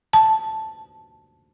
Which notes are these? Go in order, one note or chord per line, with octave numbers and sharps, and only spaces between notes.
A5